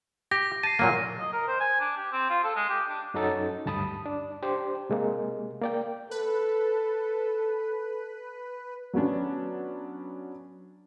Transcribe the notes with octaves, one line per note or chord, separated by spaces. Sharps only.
G4 A#6
A5 C7 D#7
A#2 F#3 A#3
D#5
A#4
C5
G#5
D4
G4
C4
F4
A4
G#3
G4
D4
F#2 F#3 C#4 D#4 A4 A6
D2 G2 A5 B5 D#6
D4
D4 G4 C5
C3 G#3 A#3
A#3 D5 G5
A4 B4
F#3 B3 C#4 D4